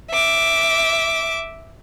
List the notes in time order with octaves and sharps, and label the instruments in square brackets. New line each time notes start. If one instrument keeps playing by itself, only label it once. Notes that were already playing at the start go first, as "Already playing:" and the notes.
[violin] E5 D6